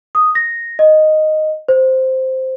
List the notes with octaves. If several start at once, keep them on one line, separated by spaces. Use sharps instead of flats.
D#6
A#6
D#5
C5